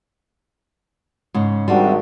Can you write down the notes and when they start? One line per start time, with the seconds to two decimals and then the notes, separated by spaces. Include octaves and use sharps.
1.34 G#2 C#3
1.68 G#1 G3 C4 D4 F#4